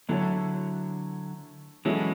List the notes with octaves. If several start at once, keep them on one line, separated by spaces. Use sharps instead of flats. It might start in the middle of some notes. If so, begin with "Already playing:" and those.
D3 F#3 A3 E4 A4 C#5
E3 F#3 G#3 C#4 E4 A4 C#5